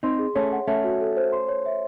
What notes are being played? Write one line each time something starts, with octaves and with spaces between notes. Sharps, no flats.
C4 D#4 C6
G#4
A3 C#4 C#5
F#5
A3 C#4 E5
F#4
A4
C5
C6
C#5
E5